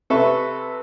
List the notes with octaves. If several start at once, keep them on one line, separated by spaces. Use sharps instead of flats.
C3 A4 B4 E5 C#6